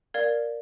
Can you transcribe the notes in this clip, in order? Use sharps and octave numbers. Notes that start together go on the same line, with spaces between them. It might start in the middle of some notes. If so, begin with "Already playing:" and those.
A#4 D5 F5 G#6